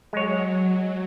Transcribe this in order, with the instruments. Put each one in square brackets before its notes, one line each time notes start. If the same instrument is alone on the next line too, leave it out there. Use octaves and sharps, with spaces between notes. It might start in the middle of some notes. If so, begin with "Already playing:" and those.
[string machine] F#3 [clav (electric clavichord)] G#3 C#5